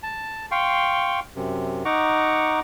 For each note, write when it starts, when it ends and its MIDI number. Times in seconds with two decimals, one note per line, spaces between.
0.03 0.46 81
0.51 1.20 77
0.51 1.20 79
0.51 1.20 84
0.51 1.20 85
1.36 1.83 42
1.36 1.83 48
1.85 2.60 63
1.85 2.60 78
1.85 2.60 82
1.85 2.60 85
1.85 2.60 86